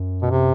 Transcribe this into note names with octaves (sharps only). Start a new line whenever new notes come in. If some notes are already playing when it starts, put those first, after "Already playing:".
Already playing: F#2
B2
C3